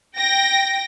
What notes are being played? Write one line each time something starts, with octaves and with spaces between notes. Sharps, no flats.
G5 A#6